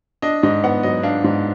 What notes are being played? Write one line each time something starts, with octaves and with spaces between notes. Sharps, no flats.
D4 D#5
G#2 D#5
B3 F#5
F#3 D#5
D4 F5
G#2